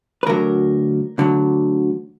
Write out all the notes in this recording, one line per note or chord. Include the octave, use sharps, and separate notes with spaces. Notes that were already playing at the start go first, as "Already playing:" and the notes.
B4
D2 D3 F#3 A#4
D2 D3 F#3